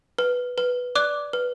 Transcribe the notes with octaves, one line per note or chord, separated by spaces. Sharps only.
B4
B4
D5 D6 F#6
B4